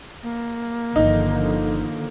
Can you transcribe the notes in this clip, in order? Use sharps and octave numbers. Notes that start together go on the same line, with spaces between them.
A#3
G1 D3 D#3 F3 D#4 E4